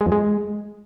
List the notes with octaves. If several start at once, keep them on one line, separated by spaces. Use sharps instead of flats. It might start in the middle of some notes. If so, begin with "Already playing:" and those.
G#3
F2
G#3